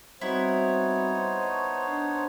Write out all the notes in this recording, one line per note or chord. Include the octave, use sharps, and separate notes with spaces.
G3 B3 C4 D#4 E4 F#4 C5 C#5
D#5 A5 C#6
D4 A5